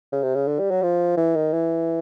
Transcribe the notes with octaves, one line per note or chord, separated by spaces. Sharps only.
C#3
C3
C#3
D3
G3
F#3
F3
E3
D#3
E3